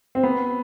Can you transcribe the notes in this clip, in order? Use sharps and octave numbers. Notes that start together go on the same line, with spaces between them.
C4
B3